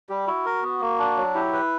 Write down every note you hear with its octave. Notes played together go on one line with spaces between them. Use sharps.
G3 G4
E4 F#4
A#4
B3
A#3
D4
F#3
E4 G4
B4